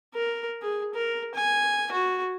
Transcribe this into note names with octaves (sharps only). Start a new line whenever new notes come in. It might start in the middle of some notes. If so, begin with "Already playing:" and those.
A#4
G#4
A#4
G#5
F#4